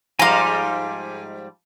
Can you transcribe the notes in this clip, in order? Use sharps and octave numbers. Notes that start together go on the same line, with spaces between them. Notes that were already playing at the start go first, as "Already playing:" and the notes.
G#2 F3 G3 F5 G#5 A#5 C6 D6